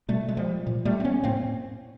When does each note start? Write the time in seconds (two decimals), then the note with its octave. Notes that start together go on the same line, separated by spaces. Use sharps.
0.08 B2 G3 A3
0.29 G#3
0.37 F3 G3
0.67 A#2
0.85 G3 A3
1.00 C4
1.04 B3 C#4
1.23 A2 A#3 C4